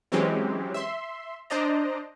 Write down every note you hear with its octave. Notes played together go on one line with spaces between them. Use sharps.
E3 F#3 G#3 C4 C#4 G4
E5 C6
D4 C5 D5 D#5 A#5